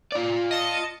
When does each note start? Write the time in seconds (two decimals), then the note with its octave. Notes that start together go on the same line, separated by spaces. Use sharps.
0.12 F4 D5
0.51 D#5 A5 C#7